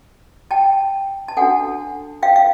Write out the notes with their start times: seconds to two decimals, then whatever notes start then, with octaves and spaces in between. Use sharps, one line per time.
0.51 G5 A5
1.28 A5
1.37 D4 F#4 A4 F#5 G#5
2.23 F5 G5
2.36 F5